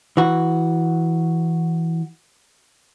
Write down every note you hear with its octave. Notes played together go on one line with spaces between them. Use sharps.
E3 F#4